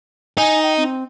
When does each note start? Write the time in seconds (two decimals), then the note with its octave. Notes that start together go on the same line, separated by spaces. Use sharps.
0.38 D#4 G#5
0.63 G5
0.77 C4